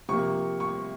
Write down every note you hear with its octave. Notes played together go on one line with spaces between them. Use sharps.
C3 F3 A#3 C#6
C#6